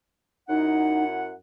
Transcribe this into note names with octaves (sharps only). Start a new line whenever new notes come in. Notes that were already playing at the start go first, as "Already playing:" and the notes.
F#2 D#4 E4 F#5